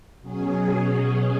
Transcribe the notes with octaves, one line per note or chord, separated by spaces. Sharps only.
B2 F#3 C#4 G#4